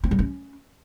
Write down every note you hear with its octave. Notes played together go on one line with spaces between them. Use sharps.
C4
G3
C#4